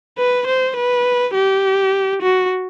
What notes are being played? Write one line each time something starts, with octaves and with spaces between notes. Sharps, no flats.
B4
C5
B4
G4
F#4